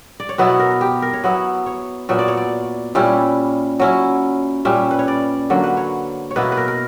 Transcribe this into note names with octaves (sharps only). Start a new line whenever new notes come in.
D5
C#5
B2 F#3 B3 E4 B4
A#4
G4
A#4
C#5
F#3 B3 E4 B4
C#5
A#2 F#3 B3 E5
D5
C#5
D5
A#2 G3 C#4 E4
F#3 C#4 E4
A#2 G3 C#4 E5
B4
C#5
D5
D3 F#3 A#3 C#5
B4
C#5
C#5
B2 A#3 E4 B4
B4
A#4
A#4